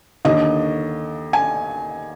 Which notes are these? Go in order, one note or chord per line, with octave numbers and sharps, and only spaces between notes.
D#2 D3 D#5
G#5